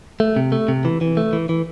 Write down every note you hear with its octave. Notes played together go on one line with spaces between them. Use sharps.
A3
C3
A3
C3
E3
E3
A3
E3
E3